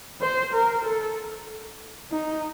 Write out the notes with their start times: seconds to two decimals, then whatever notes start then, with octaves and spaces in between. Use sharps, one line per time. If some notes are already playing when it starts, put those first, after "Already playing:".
0.21 C5
0.53 A#4
0.85 A4
2.11 D#4